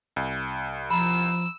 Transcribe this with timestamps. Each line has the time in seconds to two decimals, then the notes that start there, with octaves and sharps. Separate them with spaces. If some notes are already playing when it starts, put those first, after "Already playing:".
0.16 C2
0.91 F3 A#5 B5 E6